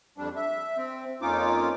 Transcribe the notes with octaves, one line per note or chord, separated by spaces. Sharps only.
F2 G3 D4
E5
C4
F2 A#3 C#4 D#4 F4 D6